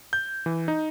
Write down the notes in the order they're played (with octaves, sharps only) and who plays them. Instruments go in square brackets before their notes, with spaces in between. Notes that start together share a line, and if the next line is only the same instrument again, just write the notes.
[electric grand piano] G6
E3
D#4